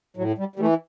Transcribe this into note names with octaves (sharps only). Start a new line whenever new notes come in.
A2 F#3
G3
G3
E3 A3